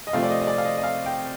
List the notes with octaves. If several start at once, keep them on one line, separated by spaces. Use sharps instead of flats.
D#5
C3 F3 A3 C4 F5
D5
D#5
D#5
D5
F5
D#5
D#5
F5
G5